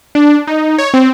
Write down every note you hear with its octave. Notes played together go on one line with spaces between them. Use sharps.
D4
D#4
C#5
C4